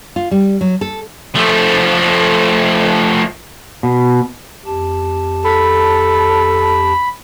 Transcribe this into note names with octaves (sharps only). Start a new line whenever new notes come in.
F4
G3
F#3
A4
F3 A3
B2
F2 G4 A5
A4 B5